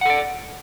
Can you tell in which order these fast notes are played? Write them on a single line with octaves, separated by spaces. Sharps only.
F#5 A4 D5